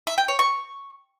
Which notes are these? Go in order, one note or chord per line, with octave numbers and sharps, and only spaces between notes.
E5
G5
C#5
C#6